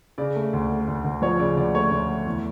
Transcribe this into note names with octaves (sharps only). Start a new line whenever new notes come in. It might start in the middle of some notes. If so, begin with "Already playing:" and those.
C#3 D5
A3
D2
A3
D2
D2
F3 C#5
C#3 D5
D2 D5
A3 C#5
D2
A3
E2